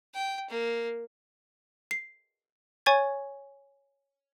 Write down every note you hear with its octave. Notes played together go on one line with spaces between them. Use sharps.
G5
A#3
C7
C#5 G#5 C#6 G#6 A6